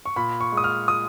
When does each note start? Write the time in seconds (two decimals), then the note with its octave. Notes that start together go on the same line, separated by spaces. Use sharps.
0.05 C#6
0.16 A#2 B5
0.41 C#6
0.52 G#3
0.57 D#6
0.64 F6
0.88 F4 D#6